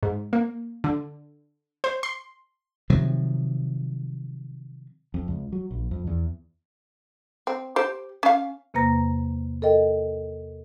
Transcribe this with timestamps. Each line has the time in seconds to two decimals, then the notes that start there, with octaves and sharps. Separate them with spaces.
0.03 G#2
0.33 A#3
0.84 D3
1.84 C5
2.03 C6
2.90 C3 D#3 F3 F#3
5.14 F2
5.28 C#2
5.52 F#3
5.71 A#1
5.91 F2
6.07 E2
7.47 C4
7.76 G4 C5
8.23 C#4 F5
8.74 E2 C3 A#3 B4 A#5 A#6
9.62 A4 A#4 D#5 G5